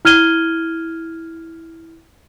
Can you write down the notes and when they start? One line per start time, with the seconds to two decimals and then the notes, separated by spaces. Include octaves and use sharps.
0.05 E4 F6 G#6 D#7 G7